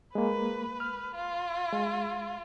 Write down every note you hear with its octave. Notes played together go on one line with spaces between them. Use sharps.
G#3 A#3 B4
F6
F4
G#3